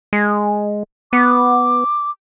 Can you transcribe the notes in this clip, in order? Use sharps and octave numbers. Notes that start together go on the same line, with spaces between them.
G#3
B3 D6